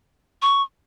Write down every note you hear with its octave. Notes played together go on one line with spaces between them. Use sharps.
C#6